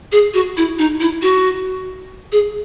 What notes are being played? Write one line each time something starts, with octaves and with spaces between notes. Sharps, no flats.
G#4
F#4
E4
D#4
E4
F#4
G#4